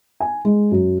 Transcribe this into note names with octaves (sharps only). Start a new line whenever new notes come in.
G#5
G#3
F#2